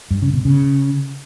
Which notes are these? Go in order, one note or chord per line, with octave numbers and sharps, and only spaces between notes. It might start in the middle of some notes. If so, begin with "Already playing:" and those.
G2
C#3
B2
C#3